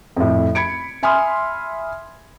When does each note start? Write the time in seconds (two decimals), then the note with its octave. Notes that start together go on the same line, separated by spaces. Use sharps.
0.16 F2 A2
0.55 B5 G#6 C#7 D7
1.03 E5 G#5 B5 C6 D#6 F6